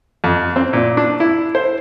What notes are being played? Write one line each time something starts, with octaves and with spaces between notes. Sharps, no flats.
F2
C4
A#2
D4
E4
C5